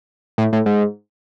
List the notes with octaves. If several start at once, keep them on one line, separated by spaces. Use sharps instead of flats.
A2
A2
G#2